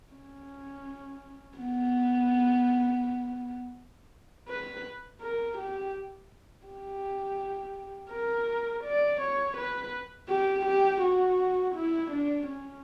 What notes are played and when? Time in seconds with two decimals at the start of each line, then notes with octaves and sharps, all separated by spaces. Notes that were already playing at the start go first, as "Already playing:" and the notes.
0.13 C#4
1.58 B3
4.49 B4
5.21 A#4
5.58 G4
6.67 G4
8.11 A#4
8.84 D5
9.21 C#5
9.58 B4
10.30 G4
10.66 G4
11.02 F#4
11.75 E4
12.11 D4
12.48 C#4